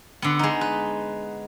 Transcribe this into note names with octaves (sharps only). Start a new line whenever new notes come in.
D3 B3
G#3 D#4
B4